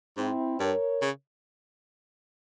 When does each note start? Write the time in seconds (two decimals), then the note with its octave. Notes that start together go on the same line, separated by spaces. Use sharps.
0.17 G#2 C4 E4
0.60 G2 A#4 C#5
1.02 C#3